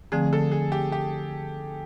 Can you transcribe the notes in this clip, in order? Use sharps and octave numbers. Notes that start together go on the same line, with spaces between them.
D3 F3 A3 C4 G#4
A4
G#4
G4
G4